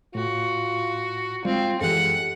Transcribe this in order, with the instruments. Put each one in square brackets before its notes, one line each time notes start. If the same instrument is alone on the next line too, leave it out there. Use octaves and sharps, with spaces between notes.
[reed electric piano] A2 [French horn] F4 [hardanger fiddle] F#4
[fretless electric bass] G3 G#3 [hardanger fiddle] C4 [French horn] F4
[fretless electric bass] F#2 E3 [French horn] G#3 [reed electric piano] G4 A4 [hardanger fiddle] F#5